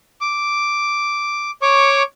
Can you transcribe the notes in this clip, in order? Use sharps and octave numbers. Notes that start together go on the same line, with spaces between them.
D6
C#5 C#6 D6